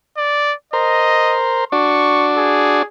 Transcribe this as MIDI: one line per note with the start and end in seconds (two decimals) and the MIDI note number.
0.17 0.54 74
0.73 1.65 70
0.73 1.65 72
0.73 1.36 75
1.72 2.82 62
1.72 2.82 66
1.72 2.82 74
1.72 2.29 85
2.37 2.85 68